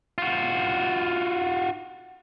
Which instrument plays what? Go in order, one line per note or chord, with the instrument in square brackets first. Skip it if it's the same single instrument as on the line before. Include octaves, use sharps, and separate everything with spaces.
[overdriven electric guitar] F4 F#4